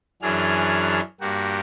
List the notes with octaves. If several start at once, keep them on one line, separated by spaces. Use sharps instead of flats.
F#2 E3 F#3 D4 G#4 F6
G2 A#3 F#4 G4